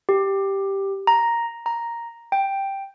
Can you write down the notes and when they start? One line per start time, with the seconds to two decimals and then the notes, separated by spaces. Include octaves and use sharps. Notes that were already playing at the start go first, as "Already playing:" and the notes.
0.09 G4
1.07 A#5
1.66 A#5
2.32 G5